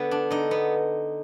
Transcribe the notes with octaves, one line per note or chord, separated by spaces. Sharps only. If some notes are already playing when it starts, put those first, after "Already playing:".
Already playing: D3 B3
D4
D3 D#4
B3